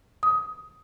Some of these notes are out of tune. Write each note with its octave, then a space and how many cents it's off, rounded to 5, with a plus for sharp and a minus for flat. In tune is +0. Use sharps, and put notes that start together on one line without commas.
D#6 +20